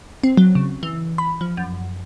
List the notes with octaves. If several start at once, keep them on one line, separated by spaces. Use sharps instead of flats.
C4
F#3
C#3
E3
B5
F3
F#2